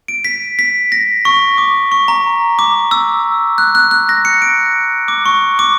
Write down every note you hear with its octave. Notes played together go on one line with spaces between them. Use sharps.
D7
B6
B6
A#6
C#6
D6
C#6
A#5
D6
E6
F#6
F#6
F#6
A#6
C#7
D7
D6
C#6
D6